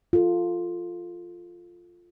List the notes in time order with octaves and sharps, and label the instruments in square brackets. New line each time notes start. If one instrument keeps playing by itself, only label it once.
[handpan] F4 A4